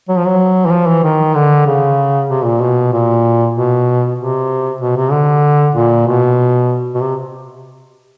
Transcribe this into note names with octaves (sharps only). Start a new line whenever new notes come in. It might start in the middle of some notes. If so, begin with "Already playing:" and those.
F#3
F3
F#3
E3
F3
E3
D#3
D3
C#3
C3
A#2
B2
A#2
B2
C3
B2
C3
D3
A#2
B2
B2
C3